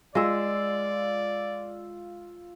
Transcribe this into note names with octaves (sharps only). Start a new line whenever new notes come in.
G#3 F4 D5 E6